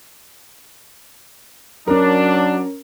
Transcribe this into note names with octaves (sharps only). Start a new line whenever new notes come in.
F#3 C#4 D4 A#4